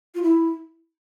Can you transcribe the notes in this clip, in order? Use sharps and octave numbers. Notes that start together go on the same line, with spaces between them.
F4
E4